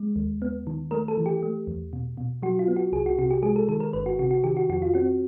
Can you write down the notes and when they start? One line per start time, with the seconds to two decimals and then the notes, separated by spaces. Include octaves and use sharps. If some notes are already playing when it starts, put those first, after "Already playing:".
Already playing: G#3
0.16 D#2
0.42 B3
0.67 D#3
0.91 A3 A#4
1.08 A4
1.17 E3
1.26 G4
1.43 A3
1.67 E2
1.93 B2
2.17 B2
2.42 F#3 F#4
2.59 F4
2.68 B3
2.76 F#4
2.92 C2 G#4
3.06 F#4
3.18 C3 F#4
3.31 G4
3.43 G#3 G#4
3.56 A4
3.69 D#3 A4
3.80 A#4
3.93 G1 B4
4.06 F#4
4.19 C3 F#4
4.31 F#4
4.44 D#3 G4
4.57 F#4
4.69 F2 F#4
4.82 F4
4.94 C4 F#4